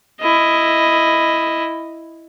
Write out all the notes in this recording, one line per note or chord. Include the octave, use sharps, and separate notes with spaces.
E4 D#5